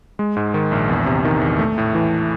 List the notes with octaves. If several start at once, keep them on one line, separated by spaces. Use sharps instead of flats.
G#3
G#2
D#3
A#1
E2
C3
D#3
E2
A3
A2
E3